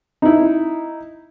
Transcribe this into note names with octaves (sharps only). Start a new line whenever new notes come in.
D#4 E4